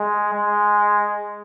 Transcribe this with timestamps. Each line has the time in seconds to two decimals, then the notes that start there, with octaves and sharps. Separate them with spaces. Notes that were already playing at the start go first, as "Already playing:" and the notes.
Already playing: G#3
0.33 G#3